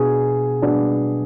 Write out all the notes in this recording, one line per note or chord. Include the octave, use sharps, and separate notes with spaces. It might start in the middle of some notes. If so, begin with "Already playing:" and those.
Already playing: B2 B3 D4 G#4
B2 B3 D4